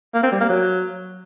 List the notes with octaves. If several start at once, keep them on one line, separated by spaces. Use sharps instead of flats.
A#3
C4
G3
A#3
F#3